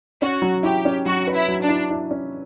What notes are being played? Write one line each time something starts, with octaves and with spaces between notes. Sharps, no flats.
C#4 F#4
F#3
E4 G4
C#4
F#3 F#4
B4
E4
F#3
D4
E4
E4
C#4